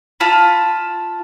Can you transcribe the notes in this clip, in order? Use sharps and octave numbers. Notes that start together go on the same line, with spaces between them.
F4 A5 B5